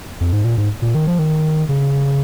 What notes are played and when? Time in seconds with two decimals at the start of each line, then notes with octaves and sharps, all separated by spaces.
0.21 F2
0.33 G#2
0.44 A#2
0.58 G#2
0.82 A#2
0.95 D#3
1.07 F3
1.19 D#3
1.69 C#3